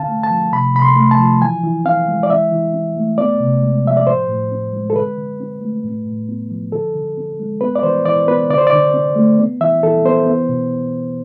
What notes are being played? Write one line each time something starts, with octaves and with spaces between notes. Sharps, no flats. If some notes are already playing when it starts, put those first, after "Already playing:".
Already playing: D3 C4 F5 A5
A3
A5
F3
C3 B5
C3 B5
C6
A3
A5
F3
E3 G#5
E3
C4 F5
G#3
D5
E3 E5
E3
C4
A3
B3 D5
C3
G#3
F3 E5
D5
A2 C5
A2
C4
G#3
A4
D3 B4
D3
C4
A3
A2
A2
B3
F3
D3 A4
D3
C4
G#3
B3 B4
D5
E3 C5
E3 D5
B3 B4
D3 D5
C5
D5
D3
C4
A3
B3
E3 E5
E3 A4
B3 C5
B3
B2